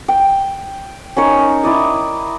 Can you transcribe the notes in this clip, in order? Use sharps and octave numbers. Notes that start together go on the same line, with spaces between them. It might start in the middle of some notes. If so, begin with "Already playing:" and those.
G5
C#4 D#4 A#4 C#5
E4 D5 D#5